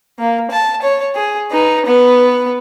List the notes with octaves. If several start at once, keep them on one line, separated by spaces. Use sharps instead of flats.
A#3
A5
C#5
G#4
D#4 B4
B3